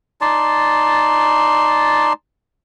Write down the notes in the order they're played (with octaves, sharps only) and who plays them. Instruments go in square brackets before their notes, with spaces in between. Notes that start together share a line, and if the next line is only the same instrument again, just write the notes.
[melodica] D#4 D5 A5 C6